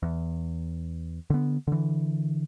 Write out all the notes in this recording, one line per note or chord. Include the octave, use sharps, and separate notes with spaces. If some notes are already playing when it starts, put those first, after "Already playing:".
E2
D3 B3
D3 E3